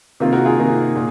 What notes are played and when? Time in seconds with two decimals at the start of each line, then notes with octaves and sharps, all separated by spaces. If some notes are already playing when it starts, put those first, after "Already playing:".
0.20 C3 D#3 A#3 F4
0.33 F#4 A#4
0.45 F4 G#4
0.58 C3 D#3 A#3 F4
0.95 A#2